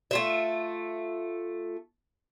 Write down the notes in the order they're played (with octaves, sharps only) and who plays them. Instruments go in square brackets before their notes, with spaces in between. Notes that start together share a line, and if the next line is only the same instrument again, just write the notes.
[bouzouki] A3 F4 E5